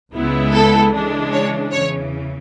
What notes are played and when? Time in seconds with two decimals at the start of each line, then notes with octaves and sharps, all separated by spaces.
0.14 C#2 C#3 G#3 B3 E4
0.54 A4
0.93 C#3 E3 G#3 D4
1.32 C#5
1.72 E2 C#3 E3 C#5